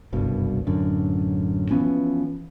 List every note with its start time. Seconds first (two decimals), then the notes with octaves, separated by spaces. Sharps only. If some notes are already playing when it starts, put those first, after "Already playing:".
0.12 F#1 C2 G2 B2
0.66 A1 F#2 D3
1.71 E3 F3 B3 C#4